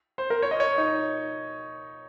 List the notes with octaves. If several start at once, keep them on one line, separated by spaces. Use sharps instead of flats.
C5
A#4
C#5
D#5
C#5
D#4